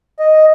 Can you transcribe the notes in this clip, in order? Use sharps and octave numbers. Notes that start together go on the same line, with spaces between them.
D#5